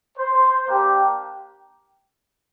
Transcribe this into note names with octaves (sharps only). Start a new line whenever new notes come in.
C5
A#3 D4 G4